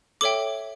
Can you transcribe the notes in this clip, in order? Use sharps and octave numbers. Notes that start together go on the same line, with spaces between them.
A4 C#5 E5 G5 D6